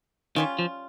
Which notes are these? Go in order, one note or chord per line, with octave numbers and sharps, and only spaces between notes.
D#3 G3 C#4 F4
F3